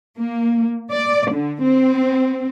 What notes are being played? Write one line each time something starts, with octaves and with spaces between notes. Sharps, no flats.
A#3
D5
D3
C4